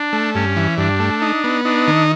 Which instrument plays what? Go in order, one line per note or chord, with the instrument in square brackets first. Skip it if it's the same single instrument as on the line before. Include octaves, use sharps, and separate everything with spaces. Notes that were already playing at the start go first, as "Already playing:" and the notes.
Already playing: [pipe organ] D4
[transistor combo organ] A3
[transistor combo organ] G2 [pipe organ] C#4
[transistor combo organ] E3
[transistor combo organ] G2 [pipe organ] D4
[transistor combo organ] A3
D#4
B3
[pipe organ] D4 [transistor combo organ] D#4
[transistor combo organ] D#3